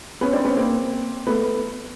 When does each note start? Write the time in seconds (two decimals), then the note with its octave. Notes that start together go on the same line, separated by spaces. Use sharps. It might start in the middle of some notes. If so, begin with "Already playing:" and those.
0.21 B3 C#4
0.33 C4 D4
0.45 B3 C#4
0.57 A#3 C4
1.27 A3 B3